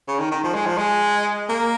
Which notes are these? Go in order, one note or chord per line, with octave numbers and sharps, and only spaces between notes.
C#3
D#3
D#3
F3
G#3
F3
G#3
A#3